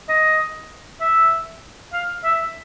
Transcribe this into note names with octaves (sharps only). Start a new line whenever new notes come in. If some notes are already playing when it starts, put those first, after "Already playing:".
D#5
E5
F5
E5